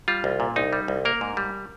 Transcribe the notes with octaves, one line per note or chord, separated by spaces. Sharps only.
G3 F4
C2
A#2
C2 D#4
G3
C2
A#3 A#4
G#2
G3